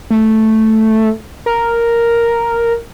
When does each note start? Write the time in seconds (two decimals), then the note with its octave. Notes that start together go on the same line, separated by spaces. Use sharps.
0.10 A3
1.46 A#4